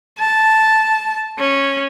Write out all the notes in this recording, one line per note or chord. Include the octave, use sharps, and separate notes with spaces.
A5
C#4